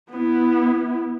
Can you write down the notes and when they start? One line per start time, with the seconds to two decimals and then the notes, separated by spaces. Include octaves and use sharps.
0.10 B3 E4